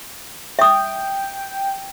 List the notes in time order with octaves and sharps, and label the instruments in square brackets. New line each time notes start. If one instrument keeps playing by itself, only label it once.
[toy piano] E5 D#6 [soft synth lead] G5